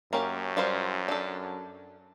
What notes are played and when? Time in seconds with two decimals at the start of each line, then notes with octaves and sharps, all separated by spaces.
0.13 F#2 A#3 C#4 G4
0.57 G3 F4 C5
1.08 D4 A4